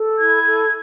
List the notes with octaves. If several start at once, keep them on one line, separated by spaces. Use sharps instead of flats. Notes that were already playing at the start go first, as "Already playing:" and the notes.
Already playing: A4
E4 G#6
A4